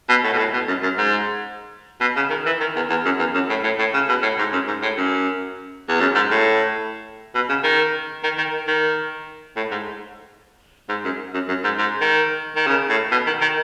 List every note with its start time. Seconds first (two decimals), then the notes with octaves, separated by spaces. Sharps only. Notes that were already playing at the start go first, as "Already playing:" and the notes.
0.09 B2
0.24 A2
0.33 B2
0.38 A2
0.54 B2
0.68 F#2
0.83 F#2
0.98 G#2
2.01 B2
2.16 C#3
2.30 D#3
2.46 E3
2.61 D#3
2.76 E2
2.90 E2
3.05 F#2
3.19 E2
3.34 F#2
3.50 A2
3.64 A2
3.79 A2
3.94 C#3
4.09 B2
4.23 A2
4.39 G#2
4.53 F#2
4.68 G#2
4.83 A2
4.97 F#2
5.89 E2
6.01 F#2
6.15 G#2
6.31 A2
7.35 B2
7.49 C#3
7.64 D#3
8.24 D#3
8.38 D#3
8.67 D#3
9.57 A2
9.71 G#2
10.89 G#2
11.05 F#2
11.34 F#2
11.49 F#2
11.64 G#2
11.78 G#2
12.01 D#3
12.56 D#3
12.67 C#3
12.89 A2
13.12 B2
13.27 D#3
13.42 D#3